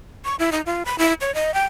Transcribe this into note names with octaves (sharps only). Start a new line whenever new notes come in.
C#6
E4
D#4
F4
B5
E4
C#5
D#5
G5